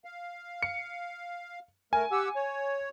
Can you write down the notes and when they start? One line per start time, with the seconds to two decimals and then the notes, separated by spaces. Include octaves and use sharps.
0.04 F5
0.63 C#7
1.93 A3 A#4 G#5
2.11 G4 F#5 E6
2.36 C#5